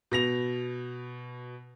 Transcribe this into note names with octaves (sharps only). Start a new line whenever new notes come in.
B2 A#6 F7